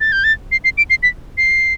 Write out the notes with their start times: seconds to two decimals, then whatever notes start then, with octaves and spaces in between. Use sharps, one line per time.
0.01 A6
0.12 G6
0.24 A6
0.52 C7
0.64 C7
0.78 D7
0.90 C7
1.03 B6
1.38 C7